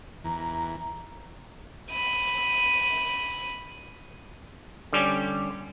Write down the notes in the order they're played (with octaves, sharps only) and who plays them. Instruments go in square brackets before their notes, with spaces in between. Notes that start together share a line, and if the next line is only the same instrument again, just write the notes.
[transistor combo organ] E2 [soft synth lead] A#5
[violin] B5 D#7
[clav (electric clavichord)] D3 G3 C#4 G4